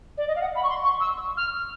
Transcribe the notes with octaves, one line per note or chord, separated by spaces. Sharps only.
D5
D#5
F5
F#5
B5
C#6
C6
C#6
E6
F6